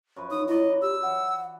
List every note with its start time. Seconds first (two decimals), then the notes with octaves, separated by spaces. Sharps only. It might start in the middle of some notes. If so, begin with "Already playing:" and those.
0.16 F#2 F3 B4
0.31 D#4 D#6
0.48 F#3 E4 D5 D#5
0.82 G4 E6
1.03 E3 F#5